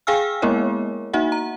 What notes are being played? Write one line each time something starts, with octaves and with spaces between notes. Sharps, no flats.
G#4 F5 G5 G#5 E6 F6
G#3 A#3 B3 E4 A#4 C#5
A#3 D#4 F#4 E5 F#5
A#5